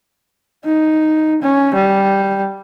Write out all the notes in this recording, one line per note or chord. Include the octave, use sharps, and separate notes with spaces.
D#4
C#4
G3